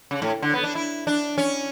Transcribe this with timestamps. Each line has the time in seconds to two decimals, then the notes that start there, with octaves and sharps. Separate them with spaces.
0.11 C#3
0.22 A2
0.42 D3
0.53 B3
0.64 D4
0.75 E4
1.07 D4
1.38 C#4